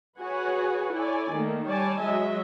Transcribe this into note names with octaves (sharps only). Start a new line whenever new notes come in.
F#4 G#4 B4 C#5 F#5 G#5
E4 A4 C#5 D5 G#5
D#3 A3 A#3
G3 C#5 D5 G#5 A5
F#3 G#3 D#5 E5